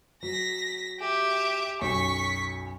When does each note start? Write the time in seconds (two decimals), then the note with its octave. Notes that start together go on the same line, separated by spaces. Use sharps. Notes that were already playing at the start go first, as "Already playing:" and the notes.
0.23 F#3 A#6 B6
1.00 G4 E5
1.82 B1 F#2 C#6 B6